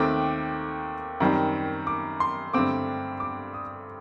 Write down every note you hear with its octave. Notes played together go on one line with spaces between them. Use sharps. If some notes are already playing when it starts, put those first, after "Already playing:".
Already playing: D#2 D#3 A3 C4 D6
F#2 D#3 G3 C4
D6
C6
G2 D3 A3 C4 D6
D6
D#6